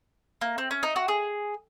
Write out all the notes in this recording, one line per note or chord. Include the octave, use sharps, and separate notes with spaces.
A#3
C4
C#4
D#4
F#4
G#4